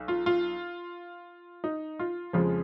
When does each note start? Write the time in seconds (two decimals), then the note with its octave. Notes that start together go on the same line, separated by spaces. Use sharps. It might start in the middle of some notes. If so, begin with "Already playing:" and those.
Already playing: B1
0.08 F4
0.26 F4
1.64 D#4
1.99 F4
2.33 F2 C#3 F3 G#3 F4